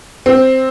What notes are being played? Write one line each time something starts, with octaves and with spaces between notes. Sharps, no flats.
C4